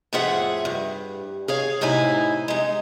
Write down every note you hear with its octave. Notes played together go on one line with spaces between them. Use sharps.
F2 A2 F4 G#4 E5 F#5
G2
G#4 C#5 F5
F#2 A2 C3 D#4 E4 G#5
G#3 D#4